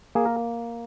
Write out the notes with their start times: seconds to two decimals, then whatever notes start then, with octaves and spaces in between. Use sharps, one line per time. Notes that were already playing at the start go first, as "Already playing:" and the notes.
0.15 A#3 G#4
0.26 A#4